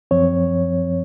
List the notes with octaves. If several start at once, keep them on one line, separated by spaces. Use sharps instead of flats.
F#2 F3 C4 C#5